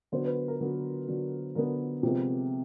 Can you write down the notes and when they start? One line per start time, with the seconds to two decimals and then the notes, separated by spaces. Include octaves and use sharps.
0.12 D3 F#3 B3 C5
0.25 B4
0.48 A#4
0.60 D3 F#3 B3
1.08 D3 F#3 B3
1.55 D3 F#3 B3 A#4
2.03 C3 F3 G#3 B3